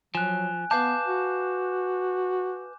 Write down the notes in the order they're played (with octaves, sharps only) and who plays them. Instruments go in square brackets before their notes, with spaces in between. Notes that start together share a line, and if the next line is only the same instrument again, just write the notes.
[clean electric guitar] F3 [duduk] F#3 [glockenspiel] G#5 F#6
[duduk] B3 [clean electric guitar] B4 F5 A5 [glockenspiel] D6 G6 E7
[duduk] F#4